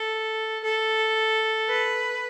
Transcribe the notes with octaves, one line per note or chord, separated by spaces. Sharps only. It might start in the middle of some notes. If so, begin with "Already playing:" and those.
Already playing: A4
A4
B4